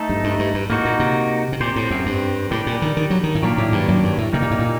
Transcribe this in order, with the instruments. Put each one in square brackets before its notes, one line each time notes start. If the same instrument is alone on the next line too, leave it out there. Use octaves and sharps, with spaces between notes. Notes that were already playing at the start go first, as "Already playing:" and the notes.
Already playing: [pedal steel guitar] A3 D#4 A4
[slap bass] G2
G2
G2
G2
[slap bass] A2 [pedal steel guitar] A#3 D#4 F#4
[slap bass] A#2
C3
C3
[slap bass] A#2 [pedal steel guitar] C4 G4 C5
[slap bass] A2
F#2
G2
[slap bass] A2 [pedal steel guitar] G3 D4 G4
[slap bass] A#2
D#3
D#3
F#3
D#3
A2
[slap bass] A#2 [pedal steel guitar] D#3 F#3 A#3 D4 G4
[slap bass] A2
G2
F#2
G2
A2
[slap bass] C3 [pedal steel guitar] G3 A#3 D#4
[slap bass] A#2
A2
A#2